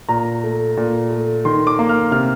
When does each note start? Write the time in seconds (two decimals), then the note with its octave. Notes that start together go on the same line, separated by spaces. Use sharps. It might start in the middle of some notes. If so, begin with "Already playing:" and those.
0.09 A#2 A#5
0.44 A3
0.77 A#2
1.11 A3
1.45 D#3 C6
1.67 D6
1.79 A#3
1.89 F6
2.12 C3 F6